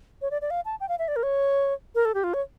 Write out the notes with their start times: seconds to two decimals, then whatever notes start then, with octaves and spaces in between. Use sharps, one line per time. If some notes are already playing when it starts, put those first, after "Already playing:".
0.22 C#5
0.31 D5
0.42 D5
0.51 F5
0.65 A5
0.80 G5
0.89 F5
0.99 E5
1.08 D5
1.16 A#4
1.23 C#5
1.95 A#4
2.05 A4
2.14 G4
2.24 F4
2.34 C#5